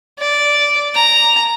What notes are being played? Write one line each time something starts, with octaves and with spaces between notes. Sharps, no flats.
D5
A#5